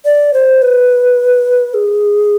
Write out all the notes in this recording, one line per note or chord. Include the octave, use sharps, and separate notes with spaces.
D5
C5
B4
G#4